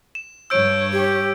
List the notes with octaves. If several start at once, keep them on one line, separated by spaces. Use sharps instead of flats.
E7
G2 C#5 E6 G6 D7
G4